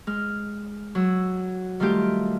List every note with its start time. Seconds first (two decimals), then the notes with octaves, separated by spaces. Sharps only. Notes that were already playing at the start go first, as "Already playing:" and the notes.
0.07 G#3 F6
0.95 F#3 E6
1.80 D#3 G3 A3 F4 G4